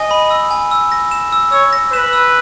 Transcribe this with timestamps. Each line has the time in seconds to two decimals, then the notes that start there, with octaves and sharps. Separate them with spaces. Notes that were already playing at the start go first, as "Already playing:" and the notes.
Already playing: D#5 G#5
0.11 B5
0.31 E6
0.51 G#5
0.71 E6
0.92 A#6
1.11 E7
1.32 E6
1.52 C#5 E6
1.73 A#6
1.93 B4 E7
2.13 E6